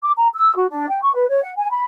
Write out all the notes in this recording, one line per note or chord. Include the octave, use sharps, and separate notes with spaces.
D6
A#5
E6
F#4
D4
G5
C#6
B4
C#5
F#5
G#5
B5